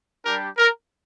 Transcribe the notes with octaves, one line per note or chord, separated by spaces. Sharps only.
G3 D4 G4 A#4
A#4